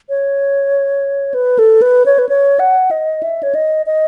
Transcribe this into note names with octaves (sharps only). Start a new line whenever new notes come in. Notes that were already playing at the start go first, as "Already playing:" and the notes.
C#5
B4
A4
B4
C#5
B4
C#5
F#5
D#5
E5
C#5
D#5
D#5